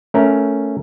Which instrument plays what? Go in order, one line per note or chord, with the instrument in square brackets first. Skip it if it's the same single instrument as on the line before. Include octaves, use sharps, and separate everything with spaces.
[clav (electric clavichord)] A3 C#4 A#4